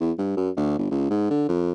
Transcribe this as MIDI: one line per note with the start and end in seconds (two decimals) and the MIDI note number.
0.01 0.12 40
0.18 0.35 43
0.37 0.50 42
0.57 0.74 38
0.79 0.87 31
0.91 1.06 37
1.10 1.30 44
1.30 1.44 50
1.48 1.72 41